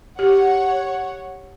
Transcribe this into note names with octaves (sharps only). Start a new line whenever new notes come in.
G4 C#5 F#5